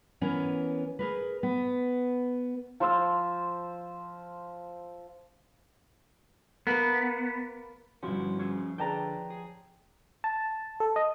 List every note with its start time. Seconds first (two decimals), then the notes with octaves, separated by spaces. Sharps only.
0.21 E3 B3 C#4 A#4
0.99 G#4 A#4 B4
1.43 B3
2.80 F3 C5 C6 E6
6.67 A#3 B3 B4
8.03 G1 F3 C#4 E4 F#4
8.39 C#4 G#4 C#5 E5
8.78 D3 G#4 B4 D5 G5 A5 A#5
9.30 G#4
10.24 A5
10.80 A4
10.96 D#5